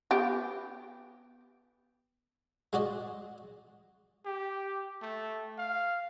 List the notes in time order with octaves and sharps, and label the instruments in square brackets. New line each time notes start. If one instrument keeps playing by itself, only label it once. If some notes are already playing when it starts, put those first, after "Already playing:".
[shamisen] B3 G4 G5
[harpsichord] G#3 F#4 D5 D#5
[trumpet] G4
A3
F5